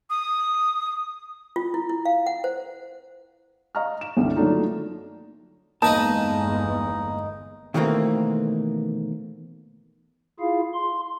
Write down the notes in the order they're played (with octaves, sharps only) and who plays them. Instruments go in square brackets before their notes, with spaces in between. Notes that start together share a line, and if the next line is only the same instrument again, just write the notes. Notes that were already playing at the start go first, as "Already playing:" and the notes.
[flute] D#6
[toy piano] F4
E4
E4
F5
F#5
C5
[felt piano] D#5 F5 A#5 C#6 F6
E7
C2 G2 D3 G3 A3
F#3 A3 A#3 D4 D#4 F4
[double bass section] G1 E2 G#3 [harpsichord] A#3 B4 D#5 [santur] D#4 [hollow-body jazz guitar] A5
[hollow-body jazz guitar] B2 D#3 E3 A3 A#3 C4
[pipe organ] E4 F4 G#4 F5
C6